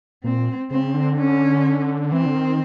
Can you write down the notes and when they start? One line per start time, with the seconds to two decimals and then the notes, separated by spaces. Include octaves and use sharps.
0.23 A#2 C4
0.70 C#3 C4
0.94 D3
1.18 C#4
2.12 E3 C4
2.26 D3
2.35 D#3